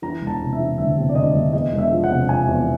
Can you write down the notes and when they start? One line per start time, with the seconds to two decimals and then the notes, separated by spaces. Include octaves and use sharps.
0.02 E3 A#5
0.21 E1
0.27 A5
0.40 C3
0.53 E5
0.59 E3
0.78 D2 E5
0.97 C3
1.09 D5
1.15 D2 D#5
1.35 D2
1.53 E2 D#5
1.73 E1
1.79 E5
1.91 F3
2.04 F#5
2.10 C3
2.29 F3 G#5
2.48 E2